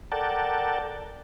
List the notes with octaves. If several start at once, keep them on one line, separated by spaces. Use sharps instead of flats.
A4 A#4 D5 F#5 G5 A5